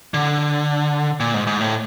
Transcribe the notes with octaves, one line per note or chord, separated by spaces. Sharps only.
D3
A#2
G#2
G#2
A2